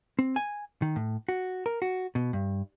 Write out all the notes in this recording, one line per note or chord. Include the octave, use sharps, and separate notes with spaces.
C4
G#5
D#3
A2
F#4
A#4
F#4
B2
G2